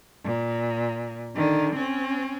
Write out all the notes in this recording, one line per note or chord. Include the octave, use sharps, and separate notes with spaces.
A#2
D3 D#3
C4 C#4